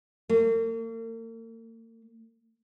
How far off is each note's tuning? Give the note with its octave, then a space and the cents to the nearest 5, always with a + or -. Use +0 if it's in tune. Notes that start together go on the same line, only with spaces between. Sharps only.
A#3 -45